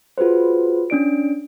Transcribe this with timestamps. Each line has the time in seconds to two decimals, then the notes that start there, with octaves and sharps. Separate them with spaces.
0.18 F4 F#4 G#4 B4 C5
0.90 C#4 D4 D5 D7